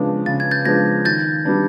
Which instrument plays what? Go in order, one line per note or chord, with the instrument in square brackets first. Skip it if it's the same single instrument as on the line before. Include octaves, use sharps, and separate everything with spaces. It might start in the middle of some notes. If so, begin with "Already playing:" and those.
Already playing: [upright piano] C#3 F3 G#3 B3 D4
[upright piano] C#3 [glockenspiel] A6
[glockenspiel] G#6
G6 A6
[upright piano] F3 G#3 B3 D4 [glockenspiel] G#6 A#6
[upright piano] D#3 [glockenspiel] G6 A6
[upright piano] G3 B3 D4